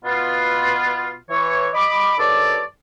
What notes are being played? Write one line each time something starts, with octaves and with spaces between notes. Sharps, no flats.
B2 B3 F4
E3 C#5
D#5 B5 D6
G2 D#3 A4 C#5 D5